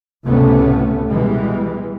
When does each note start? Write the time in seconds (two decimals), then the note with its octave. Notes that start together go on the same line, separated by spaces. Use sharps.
0.24 C#2 A2 C3 A3 B3 C#4
1.09 B2 E3 G3 G#3